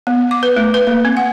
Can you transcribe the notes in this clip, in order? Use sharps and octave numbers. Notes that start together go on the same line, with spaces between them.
B3
D6
B4
A3
B4
A#3
C4
F#5